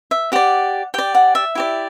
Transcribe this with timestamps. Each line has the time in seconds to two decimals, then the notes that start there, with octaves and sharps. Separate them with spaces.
0.11 E5
0.32 G4 D5 F#5
0.94 G4 D5 G5
1.15 F#5
1.35 E5
1.55 E4 G4 D5